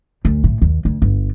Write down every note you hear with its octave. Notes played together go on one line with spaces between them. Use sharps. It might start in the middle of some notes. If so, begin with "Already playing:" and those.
D2
A2
D#2
D2
G1